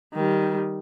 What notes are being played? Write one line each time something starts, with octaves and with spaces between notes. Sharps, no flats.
D#3 G3